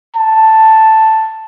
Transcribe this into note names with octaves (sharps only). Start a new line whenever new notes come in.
A5